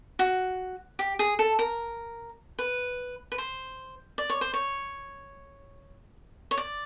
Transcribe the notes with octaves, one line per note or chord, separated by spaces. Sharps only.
F#4
G4
G#4
A4
A#4
B4
B4
C5
D5
C#5
C5
C#5
C#5
D5